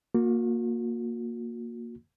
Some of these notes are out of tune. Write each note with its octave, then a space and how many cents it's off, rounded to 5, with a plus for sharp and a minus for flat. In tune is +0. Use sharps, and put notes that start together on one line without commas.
A#3 +0 F#4 -40